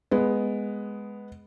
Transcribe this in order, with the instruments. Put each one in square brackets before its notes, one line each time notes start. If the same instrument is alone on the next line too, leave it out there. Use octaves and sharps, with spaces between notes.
[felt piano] G#3 B3